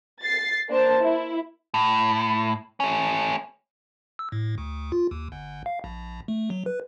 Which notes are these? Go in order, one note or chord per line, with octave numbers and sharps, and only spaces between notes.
A6 C7
A#3 D4 C5 A5
E4
A2
A3 C#4
E6
A2
D2
F4
D#2
G1
F5
A#1
A3
F#3
B4